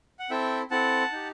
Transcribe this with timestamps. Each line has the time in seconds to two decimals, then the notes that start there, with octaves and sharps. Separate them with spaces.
0.19 F#5
0.30 C4 E4 A4 E5 G5
0.71 C4 E4 A4 F#5 A5
1.12 D#4 G4